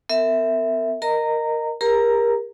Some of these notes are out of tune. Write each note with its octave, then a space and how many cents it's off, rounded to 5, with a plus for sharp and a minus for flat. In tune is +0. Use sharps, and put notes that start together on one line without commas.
B3 +45 A#4 -35 E5 -5
A#4 +0 D#5 -15 A#5 -20
G4 +40 A#4 +20 A#5 +0